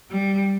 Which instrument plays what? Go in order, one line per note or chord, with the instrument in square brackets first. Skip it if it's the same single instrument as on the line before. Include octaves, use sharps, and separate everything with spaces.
[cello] G3